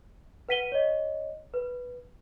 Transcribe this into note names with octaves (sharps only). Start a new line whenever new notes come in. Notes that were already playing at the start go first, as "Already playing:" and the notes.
B4 F#5 B6 D#7 G7
C#5 D#5
B4